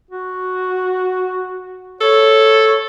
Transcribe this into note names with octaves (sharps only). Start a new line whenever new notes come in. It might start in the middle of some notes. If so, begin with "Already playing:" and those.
F#4
A4 C#5